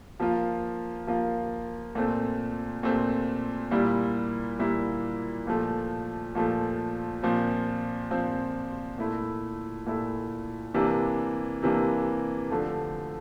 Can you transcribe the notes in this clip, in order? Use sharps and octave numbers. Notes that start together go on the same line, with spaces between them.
F3 A#3 F4
F3 A#3 F4
A#2 A3 C4
A#2 A3 C4
A#2 G3 A#3 E4
A#2 G3 A#3 E4
A#2 F3 A3
A#2 F3 A3
A#2 F3 C4
A#2 F3 C4
A#2 A3 E4
A#2 A3 E4
C3 E3 A#3 D4
C3 E3 A#3 D4
D3 F3 A3